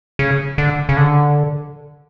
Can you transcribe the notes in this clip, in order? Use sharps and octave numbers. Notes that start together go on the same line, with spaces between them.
C#3
D3
C#3
D3